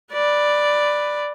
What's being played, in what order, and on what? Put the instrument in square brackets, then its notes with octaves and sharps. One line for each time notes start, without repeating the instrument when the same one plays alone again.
[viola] B4 D5